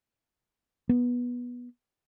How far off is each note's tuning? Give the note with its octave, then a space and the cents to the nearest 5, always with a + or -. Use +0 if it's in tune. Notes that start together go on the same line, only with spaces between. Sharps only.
B3 -15